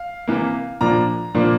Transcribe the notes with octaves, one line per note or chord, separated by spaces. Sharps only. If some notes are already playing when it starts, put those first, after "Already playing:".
Already playing: F5
C3 E3 A#3
A#2 F3 A#3 D4 A#5
A#2 F3 A#3 D4